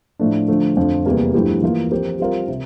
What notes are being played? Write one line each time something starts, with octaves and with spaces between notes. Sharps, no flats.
A2 F3 A3 D4
D3 F3 A3
F2 D3 F3
E2 C3 G3 A#3
G2 F3 A3 E4 G4
E3 A#3 F4
F3 C4 G4 A#4
G3 C4 F4 A#4
C3